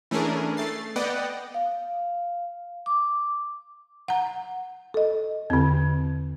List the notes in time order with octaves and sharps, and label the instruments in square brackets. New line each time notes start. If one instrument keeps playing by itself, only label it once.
[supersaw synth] E3 A3 C#4 D4 G#4 A#4
A3 A6 C7
B3 D5 D#5 F#5 G5
[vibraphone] F5
D6
[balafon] F#5 A#5
[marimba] A4 D#5
[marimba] E2 [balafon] D3 C4